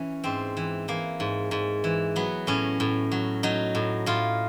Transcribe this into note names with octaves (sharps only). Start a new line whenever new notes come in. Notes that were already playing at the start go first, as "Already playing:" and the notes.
Already playing: E3 C#4
G#2 C4
E3
E3 A#3
G#2
G#2
E3
F#3 B3
A2 C#4
A2
F#3
F#3 D#4
A2
A2 F4